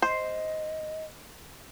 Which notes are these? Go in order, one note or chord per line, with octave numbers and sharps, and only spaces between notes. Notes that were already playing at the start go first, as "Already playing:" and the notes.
C5 D#5